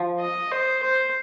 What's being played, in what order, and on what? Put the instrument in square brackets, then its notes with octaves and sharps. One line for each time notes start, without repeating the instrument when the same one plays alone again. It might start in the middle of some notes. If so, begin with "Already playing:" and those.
Already playing: [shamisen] F3
[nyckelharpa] D#5
C5
C5